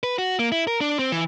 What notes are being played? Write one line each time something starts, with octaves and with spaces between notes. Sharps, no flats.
B4
F#4
A#3
E4
A#4
D4
C4
E3